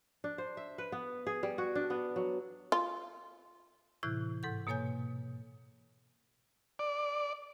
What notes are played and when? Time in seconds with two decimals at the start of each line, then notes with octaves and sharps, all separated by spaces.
0.24 D4
0.38 C5
0.57 E5
0.78 B4
0.92 B3
1.27 G#4
1.43 G3
1.58 F#4
1.75 D4
1.90 B3
2.16 F#3
2.72 F4
4.03 A2 C3 E3 E4 F#6 G6
4.43 G#2 A4 F#5 G6
4.67 B2 A#3 A4 C#5 G#5 G6
6.79 D5